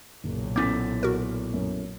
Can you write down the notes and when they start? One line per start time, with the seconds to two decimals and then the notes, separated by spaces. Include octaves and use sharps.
0.24 F#1 B1 A#2
0.56 B3 C#4 E4 A4 D6 G6 A6 B6
1.03 F#4 A#4
1.54 F#2